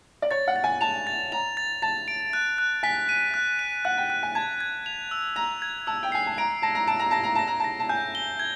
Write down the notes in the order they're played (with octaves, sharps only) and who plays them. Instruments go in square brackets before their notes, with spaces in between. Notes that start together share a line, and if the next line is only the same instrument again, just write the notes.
[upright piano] D5
[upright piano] C#5 [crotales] A6
[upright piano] F#5
[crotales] A6
[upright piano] G#5
[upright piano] A5 [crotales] F7
[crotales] A6
[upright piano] A#5 [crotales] F7
[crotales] A6
[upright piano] A5 [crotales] A6
[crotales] D7
F#6
F#6
[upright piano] G#5 [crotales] B6
[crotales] D#7
F#6
D#7
[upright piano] F#5 [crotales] F#6
[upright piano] G5
[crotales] F#6
[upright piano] G#5
[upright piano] A5 [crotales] G#6
[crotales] G#6
F7
E6
[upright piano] A#5 [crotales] F7
[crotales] G#6
[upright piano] A5 [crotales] E6
[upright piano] G5
[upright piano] G#5 [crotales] C7
[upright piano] A5
[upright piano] A#5 [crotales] D7
[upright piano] A5 [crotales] A#6
[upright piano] A#5
[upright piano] A5 [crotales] D7
[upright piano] A#5
[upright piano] A5 [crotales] A#6
[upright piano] A#5
[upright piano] A5 [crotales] A#6
[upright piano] A#5
[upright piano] A5 [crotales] A#6
[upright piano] A5
[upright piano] G#5 [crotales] G6
[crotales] G7
G#6